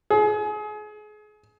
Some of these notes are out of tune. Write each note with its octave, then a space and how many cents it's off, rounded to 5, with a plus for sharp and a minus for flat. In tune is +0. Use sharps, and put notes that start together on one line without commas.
G#4 +30